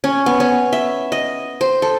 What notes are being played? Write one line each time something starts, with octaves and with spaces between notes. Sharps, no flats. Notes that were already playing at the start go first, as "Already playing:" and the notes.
C#4
B3
C#4
E5
D#5
C5
A4